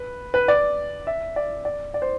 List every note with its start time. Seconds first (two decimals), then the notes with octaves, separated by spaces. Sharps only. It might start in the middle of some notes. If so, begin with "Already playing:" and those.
Already playing: B4
0.34 B4
0.48 D5
1.07 E5
1.36 D5
1.65 D5
1.94 D5
2.02 C5